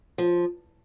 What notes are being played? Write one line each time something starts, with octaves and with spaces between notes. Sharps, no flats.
F3